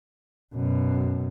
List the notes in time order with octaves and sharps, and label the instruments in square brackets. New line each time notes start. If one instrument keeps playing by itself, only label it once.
[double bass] F#2 B2